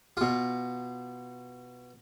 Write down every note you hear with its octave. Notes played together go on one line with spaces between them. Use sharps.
B2 F4